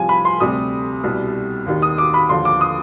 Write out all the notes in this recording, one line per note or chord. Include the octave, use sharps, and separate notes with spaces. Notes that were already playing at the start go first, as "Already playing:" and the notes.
Already playing: C2 C3 F3 G#5
B5
C6
D2 C3 G3 D#6
C2 B2 G3
D#2 D#3 G3
D#6
D6
B5
D#2 D3 F3 C6
D6
D#6